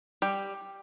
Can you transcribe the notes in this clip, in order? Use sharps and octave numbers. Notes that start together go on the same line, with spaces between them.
G3 G4